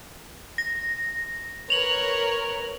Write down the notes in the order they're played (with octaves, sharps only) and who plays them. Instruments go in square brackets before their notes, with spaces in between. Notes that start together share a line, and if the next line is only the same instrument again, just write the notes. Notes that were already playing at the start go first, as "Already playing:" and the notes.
[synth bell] A#6
[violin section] A#4 B4 C#5 [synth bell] F7 F#7